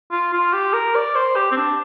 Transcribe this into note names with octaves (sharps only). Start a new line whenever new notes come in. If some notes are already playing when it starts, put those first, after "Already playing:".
F4
F4
G4
A#4
D5
C5
G4
C4
D4